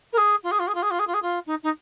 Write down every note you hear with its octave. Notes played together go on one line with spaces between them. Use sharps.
A#4
G#4
F4
G#4
F4
G#4
F4
G#4
F4
G#4
F4
G#4
F4
D#4
D#4